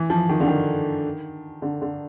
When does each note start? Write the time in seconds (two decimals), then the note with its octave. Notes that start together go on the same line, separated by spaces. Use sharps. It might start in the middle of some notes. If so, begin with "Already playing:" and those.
Already playing: E3
0.10 F3
0.29 D#3
0.40 D3
0.48 D#3
1.62 D3
1.82 D3